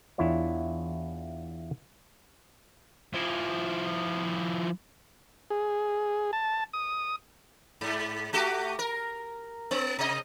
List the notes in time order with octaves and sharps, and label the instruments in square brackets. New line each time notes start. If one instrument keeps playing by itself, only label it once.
[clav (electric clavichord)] E2 D4 E4 F4 C#5
[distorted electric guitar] F3 E4
[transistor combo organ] G#4
A5
D#6
[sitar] G#2
A3 F#4 G4
A#4
B3
C3 D#5